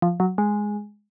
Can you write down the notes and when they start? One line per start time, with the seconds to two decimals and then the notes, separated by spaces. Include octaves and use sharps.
0.02 F3
0.20 F#3
0.38 G#3